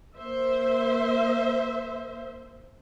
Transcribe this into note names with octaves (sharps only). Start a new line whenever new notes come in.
A#3 C5 E5